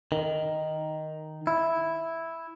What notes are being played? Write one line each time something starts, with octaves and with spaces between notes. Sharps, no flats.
D#3
E4